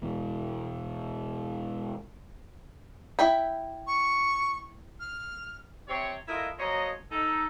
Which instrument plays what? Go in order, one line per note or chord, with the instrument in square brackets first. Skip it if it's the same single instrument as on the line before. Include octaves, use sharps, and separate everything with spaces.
[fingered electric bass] E2 B2
[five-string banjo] E4 G5 B5
[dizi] C#6
F6
[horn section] C3 C4 C#5
E4 F4 A4 A#4 D#5
F3 F#3 A#3 C#5 D#5
D#4 A4